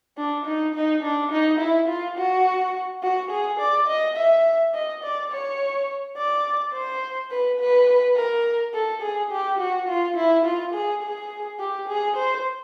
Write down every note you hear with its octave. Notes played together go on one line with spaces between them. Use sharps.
D4
D#4
D#4
D4
D#4
E4
F4
F#4
F#4
G#4
D5
D#5
E5
D#5
D5
C#5
D5
C5
B4
B4
A#4
A4
G#4
G4
F#4
F4
E4
F4
G#4
G#4
G4
G#4
C5